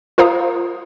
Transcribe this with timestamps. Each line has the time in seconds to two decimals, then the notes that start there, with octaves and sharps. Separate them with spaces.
0.18 F4 A#4 C5 F5 A#5 D#6